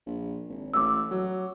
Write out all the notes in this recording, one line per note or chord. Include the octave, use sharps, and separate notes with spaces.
A#1
G#1
A1 D6 E6
F#3